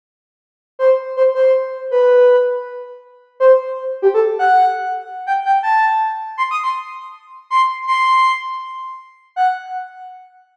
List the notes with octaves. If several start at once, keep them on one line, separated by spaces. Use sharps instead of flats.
C5
C5
C5
B4
C5
G4
A4
F#5
G5
G5
A5
C6
D#6
C6
C6
C6
F#5